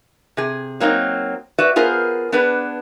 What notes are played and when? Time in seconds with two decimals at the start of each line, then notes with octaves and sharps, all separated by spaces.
0.37 C3 G#4
0.80 F#3 A#3 C4 D#4
1.58 F#4 B4 D5 E5
1.76 B3 F4 G#4 A#4 C5
2.32 B3 D4 G#4 B4